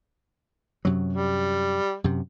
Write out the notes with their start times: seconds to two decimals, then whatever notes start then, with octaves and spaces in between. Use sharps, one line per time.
0.85 F#2 C3 F#3
1.12 G3
2.04 F#2 C3